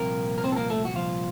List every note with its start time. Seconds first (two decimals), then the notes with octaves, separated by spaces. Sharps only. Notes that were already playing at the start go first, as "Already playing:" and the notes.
Already playing: C2 A#2 F3 A#3 C4 A#4
0.38 A#4
0.44 C4 C5
0.52 A4
0.56 A#3 A#4
0.70 A3 A4
0.85 F#4
0.96 F3 F4